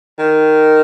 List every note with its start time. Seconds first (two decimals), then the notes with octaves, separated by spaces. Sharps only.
0.19 D#3